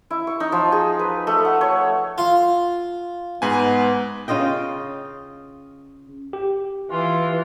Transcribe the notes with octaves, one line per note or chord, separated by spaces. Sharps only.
E4
C#6
D#4
F3
G#4
B4
A3
F#5
C#5
F4
G#2 B3 G#5
C#3 F4 D#5 G5
G4
E3 F4